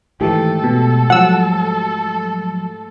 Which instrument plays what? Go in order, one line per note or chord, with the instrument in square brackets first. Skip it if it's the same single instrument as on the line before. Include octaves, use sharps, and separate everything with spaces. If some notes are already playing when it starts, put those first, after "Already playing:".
[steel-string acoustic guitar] G#2 A3 G4 [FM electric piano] D#3 E3 [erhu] A4
[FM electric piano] B2
[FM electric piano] F3 F#3 [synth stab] F#5 E6